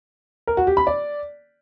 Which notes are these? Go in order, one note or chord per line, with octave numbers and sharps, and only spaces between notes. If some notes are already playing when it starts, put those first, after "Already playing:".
A#4
F#4
G4
B5
D5